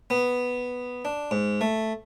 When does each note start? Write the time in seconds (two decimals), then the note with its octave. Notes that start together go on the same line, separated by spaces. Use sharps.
0.10 B3
1.05 D4
1.31 G#2
1.61 A3